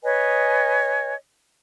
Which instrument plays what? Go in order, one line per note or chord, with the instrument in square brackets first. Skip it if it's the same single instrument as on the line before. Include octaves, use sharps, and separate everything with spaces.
[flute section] B4 C#5 D#5 G#5